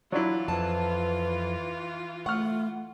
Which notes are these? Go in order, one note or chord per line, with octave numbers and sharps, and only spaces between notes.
E3 F#3 D4 E4 F4
F2 B4 A5
A3 F#5 C#6 F6